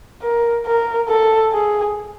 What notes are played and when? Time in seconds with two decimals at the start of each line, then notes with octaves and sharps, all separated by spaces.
0.22 A#4
0.66 A#4
1.09 A4
1.53 G#4